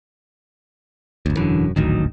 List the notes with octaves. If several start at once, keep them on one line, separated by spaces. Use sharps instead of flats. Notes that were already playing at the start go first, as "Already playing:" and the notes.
G1 D2
E1 F#2 D3 E3
D#1 A1 D2 D#3 F#3 D#4